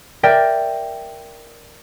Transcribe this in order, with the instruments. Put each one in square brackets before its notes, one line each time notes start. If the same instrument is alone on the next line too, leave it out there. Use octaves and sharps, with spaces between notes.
[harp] A#4 D5 E5 G5